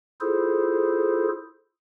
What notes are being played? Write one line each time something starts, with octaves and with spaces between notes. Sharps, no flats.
E4 F4 G#4 A4 C5